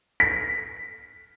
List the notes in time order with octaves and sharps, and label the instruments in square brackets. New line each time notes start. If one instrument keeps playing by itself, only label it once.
[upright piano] B6